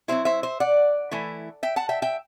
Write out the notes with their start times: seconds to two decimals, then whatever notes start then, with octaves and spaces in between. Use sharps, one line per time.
0.08 F#3 C4 E4 C5 E5
0.25 C5 E5
0.43 C5 E5
0.60 D5 F#5
1.11 E3 A3 E4
1.63 E5 G5
1.76 F#5 A5
1.89 E5 G5
2.02 E5 G5